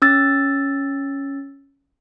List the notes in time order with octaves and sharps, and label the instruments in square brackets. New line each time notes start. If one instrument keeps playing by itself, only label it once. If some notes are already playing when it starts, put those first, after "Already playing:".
[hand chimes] C#4 E6 A6